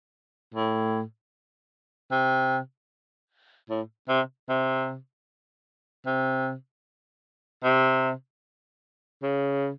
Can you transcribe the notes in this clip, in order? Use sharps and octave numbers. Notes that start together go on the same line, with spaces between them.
A2
C3
A2
C3
C3
C3
C3
C#3